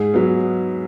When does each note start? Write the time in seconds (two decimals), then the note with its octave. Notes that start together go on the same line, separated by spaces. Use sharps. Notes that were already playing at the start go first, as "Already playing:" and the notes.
Already playing: G#2 G#4
0.14 F#3 B3